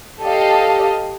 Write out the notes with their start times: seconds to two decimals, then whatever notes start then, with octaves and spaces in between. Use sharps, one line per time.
0.22 G4 A4 D#5 F5